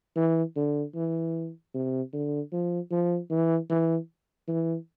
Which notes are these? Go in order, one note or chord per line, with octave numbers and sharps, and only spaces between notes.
E3
D3
E3
C3
D3
F3
F3
E3
E3
E3